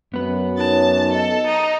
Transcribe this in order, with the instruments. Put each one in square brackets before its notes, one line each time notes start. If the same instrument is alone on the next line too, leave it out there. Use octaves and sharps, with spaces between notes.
[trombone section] F#2 [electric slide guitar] B3 B4
[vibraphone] D#4 C#5 [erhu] A5
[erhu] A4 [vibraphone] D#5
[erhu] D#4